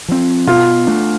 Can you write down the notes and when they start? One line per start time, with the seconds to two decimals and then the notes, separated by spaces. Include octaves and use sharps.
0.08 F3 C4
0.47 B2 F4
0.87 A3 D4